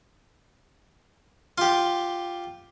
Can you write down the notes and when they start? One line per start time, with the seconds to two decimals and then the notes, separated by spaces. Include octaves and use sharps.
1.58 F4 G4